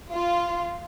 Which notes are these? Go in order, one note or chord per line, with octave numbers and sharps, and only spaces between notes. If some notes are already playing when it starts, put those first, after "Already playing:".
F4